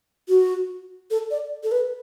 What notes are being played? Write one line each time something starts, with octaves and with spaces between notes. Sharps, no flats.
F#4
A4
D5
A4
B4